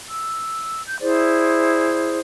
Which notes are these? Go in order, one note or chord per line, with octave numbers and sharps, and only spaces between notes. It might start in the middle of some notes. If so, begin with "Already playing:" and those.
E6
G6
E4 G#4 C5 D5